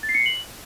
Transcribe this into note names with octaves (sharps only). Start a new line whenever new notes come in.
A6
C7
C#7
C7
F#7